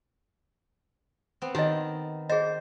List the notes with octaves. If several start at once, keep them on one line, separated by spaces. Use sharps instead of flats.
B3 C4
D#3 G4 D#5 A5
G#4 C5 D#5